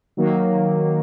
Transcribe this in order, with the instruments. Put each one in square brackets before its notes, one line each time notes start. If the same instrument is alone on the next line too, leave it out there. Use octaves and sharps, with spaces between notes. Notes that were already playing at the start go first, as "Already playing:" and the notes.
[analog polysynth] D#3 F#3 A#3